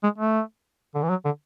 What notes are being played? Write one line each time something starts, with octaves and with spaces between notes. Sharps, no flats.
G#3
A3
D3
E3
F#3
D3